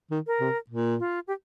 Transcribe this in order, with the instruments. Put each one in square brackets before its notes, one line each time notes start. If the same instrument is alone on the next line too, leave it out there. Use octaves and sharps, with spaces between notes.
[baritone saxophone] D#3
[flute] A#4
[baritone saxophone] C3
A#2
[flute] F4
G4